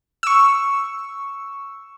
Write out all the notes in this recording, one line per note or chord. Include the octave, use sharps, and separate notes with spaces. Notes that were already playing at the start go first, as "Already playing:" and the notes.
C#6 E6